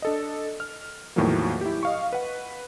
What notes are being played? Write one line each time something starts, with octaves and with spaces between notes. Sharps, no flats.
D4 A4 D#5
F6
E2 A2 D#3 F3 F#3 A#3
E4 G4
D#5 F5 C#6
B4 F#5